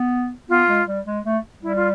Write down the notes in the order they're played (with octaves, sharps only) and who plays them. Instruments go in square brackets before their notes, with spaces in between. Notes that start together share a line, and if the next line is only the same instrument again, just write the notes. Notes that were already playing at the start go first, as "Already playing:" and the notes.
Already playing: [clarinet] B3
[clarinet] B3 [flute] F4
[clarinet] G#3
G3
G#3
A3
[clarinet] G3 [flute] E4
[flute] F4